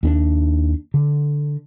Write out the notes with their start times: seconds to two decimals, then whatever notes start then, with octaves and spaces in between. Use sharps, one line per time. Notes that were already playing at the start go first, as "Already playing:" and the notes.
0.03 D#2 C#4 D4
0.94 D3